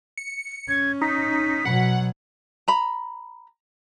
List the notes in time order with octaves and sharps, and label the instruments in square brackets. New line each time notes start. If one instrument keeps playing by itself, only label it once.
[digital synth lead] C#7
[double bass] C#4 [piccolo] G#6
[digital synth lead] D#4 [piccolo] B6
[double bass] B2 F#3 [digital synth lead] F#5
[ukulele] A#5 B5